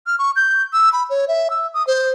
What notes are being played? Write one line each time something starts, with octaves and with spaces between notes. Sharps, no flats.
F6
C#6
G6
E6
B5
C#5
E5
E6
D#6
C5